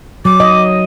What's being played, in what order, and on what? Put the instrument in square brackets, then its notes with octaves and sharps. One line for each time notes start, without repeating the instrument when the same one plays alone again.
[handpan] F#3 [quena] D6
[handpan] D#5